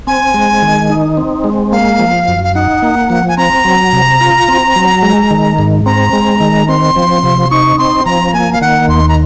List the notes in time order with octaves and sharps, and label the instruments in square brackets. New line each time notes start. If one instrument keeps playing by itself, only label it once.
[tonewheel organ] C4 [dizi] G#5
[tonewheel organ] G#3
D#3
D#4
C4
G#3
[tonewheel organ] A#3 [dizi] F5
[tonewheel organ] F3
F#2
[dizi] F5
[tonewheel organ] D#4 [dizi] F#5
[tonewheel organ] A#3
F3
[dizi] G#5
[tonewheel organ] C4 [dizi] A#5
[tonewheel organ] F#3
C3
F4
C4
F#3
G#3
D#3
G#2
[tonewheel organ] C4 [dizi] A#5
[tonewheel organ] G#3
D#3
[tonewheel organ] C4 [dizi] C6
[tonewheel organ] F3
C3
[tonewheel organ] D#4 [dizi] C#6
[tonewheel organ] C4 [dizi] C6
[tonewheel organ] F3 [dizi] A#5
[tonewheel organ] A#3 [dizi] G#5
[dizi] F5
[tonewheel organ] D#3 [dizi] F#5
[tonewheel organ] D#2 [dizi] C6
[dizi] A#5